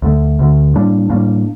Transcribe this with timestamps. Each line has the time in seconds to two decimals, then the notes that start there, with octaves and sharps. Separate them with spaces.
0.02 D2 D3 A3
0.39 D2 D3 A3
0.75 A2 G3 A#3 D4
1.10 A2 G3 A#3 D4